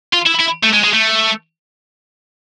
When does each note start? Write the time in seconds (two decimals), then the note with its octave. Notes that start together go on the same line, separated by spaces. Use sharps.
0.13 F4
0.26 E4
0.39 E4
0.63 A3
0.73 G#3
0.84 G#3
0.93 A3